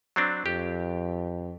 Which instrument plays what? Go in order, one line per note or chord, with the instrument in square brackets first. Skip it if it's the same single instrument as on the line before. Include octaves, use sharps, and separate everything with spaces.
[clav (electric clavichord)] F#3 C4 D4
[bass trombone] F2 [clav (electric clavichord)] G4